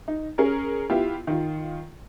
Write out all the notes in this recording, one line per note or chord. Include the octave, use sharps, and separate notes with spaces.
D#4
C#4 G#4 A#4
B3 E4 F4 G4
D#3 F4